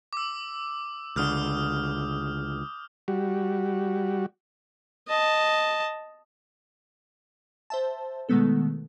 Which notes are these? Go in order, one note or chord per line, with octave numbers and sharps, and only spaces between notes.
D6 E6
C#2 D3 D#6 F6 G6
G3 F#4
D#5 A5
C5 E5 A5
B2 D#3 G#3 A3 B3 A4